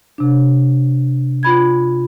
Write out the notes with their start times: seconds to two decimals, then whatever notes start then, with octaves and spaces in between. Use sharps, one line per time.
0.18 C3 D4
1.43 F4 B5 G#6